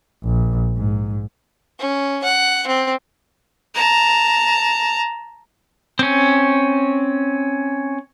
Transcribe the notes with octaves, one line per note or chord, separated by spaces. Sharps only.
A#1
G#2
C#4
F#5
C4
A5 A#5
C4 C#4